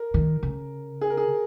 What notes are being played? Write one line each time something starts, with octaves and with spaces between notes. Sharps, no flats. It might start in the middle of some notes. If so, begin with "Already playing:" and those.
Already playing: A#4
D#3
C#3
G#4
A#4
G#4